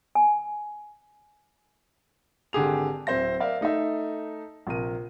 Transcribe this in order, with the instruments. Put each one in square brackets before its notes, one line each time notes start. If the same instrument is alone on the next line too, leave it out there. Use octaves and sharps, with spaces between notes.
[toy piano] G#5
[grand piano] G#1 D3 G4 G#4 F7
D1 C4 C5 E5 A#6
A#4 D5 E5 F5
A3 D#4 A4 E5
A#1 C3 A#4 D#7